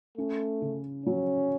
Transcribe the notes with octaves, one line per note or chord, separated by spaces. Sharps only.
A3 C#4
C#3
F#3 C#4